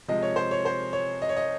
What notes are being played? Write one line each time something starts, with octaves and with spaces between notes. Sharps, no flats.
C3 F3 G#3 D#5
C#5
C5
C#5
C5
C#5
D#5
C#5
D#5